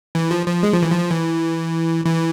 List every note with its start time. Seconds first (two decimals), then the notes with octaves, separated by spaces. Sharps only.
0.15 E3
0.31 F3
0.47 F3
0.63 G#3
0.73 F3
0.82 E3
0.92 F3
1.11 E3
2.05 E3